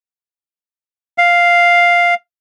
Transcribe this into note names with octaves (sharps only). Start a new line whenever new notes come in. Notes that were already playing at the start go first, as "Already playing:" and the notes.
F5